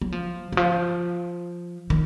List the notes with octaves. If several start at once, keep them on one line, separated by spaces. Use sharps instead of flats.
F#3
F3
D#3
F3
D#3